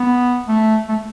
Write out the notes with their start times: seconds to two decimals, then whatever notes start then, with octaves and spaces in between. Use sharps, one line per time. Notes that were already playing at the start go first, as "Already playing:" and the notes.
Already playing: B3
0.48 A3
0.89 A3